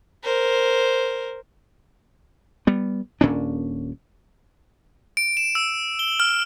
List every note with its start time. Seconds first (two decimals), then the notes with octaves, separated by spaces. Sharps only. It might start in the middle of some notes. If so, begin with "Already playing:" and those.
0.23 A#4 C5
2.67 G3 B3
3.21 D#1 A#2 C#4 D4
5.17 D7
5.37 E7
5.55 E6
5.99 G7
6.20 F6